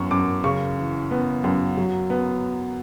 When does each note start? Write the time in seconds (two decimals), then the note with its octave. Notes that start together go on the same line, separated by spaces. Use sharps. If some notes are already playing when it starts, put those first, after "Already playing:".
Already playing: F#2 E3 B3 C#6
0.11 F#2 D6
0.44 C#3 C#6
0.78 E3
1.11 B3
1.44 F#2
1.77 F#3
2.10 B3